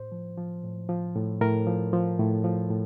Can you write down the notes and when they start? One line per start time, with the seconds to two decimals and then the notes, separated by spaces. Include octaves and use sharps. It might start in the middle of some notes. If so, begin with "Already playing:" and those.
Already playing: A2 C5
0.12 F3
0.38 F3
0.64 A2
0.89 F3
1.15 A2
1.41 A2 A#4
1.67 F3
1.93 F3
2.19 A2
2.44 F3
2.70 A2